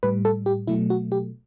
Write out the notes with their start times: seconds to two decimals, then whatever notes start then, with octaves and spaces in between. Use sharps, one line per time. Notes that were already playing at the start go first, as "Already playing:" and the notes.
0.03 A2 G3 B4
0.25 A4
0.46 G4
0.67 B2 F#3 A3 E4
0.90 F#4
1.12 G4